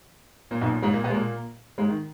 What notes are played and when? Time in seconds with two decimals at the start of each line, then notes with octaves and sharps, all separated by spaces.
0.51 A#2 A#3
0.61 B1 B2
0.72 A#2
0.82 G#2 G#3
0.93 A#2 A#3
1.04 B2 B3
1.10 G#3
1.14 A#2 A#3
1.78 G#2 G#3
1.89 D#3